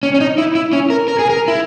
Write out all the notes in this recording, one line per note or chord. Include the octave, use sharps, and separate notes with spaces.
C#4
C#4
D#4
E4
E4
C#4
A#4
A#4
G#4
A#4
E4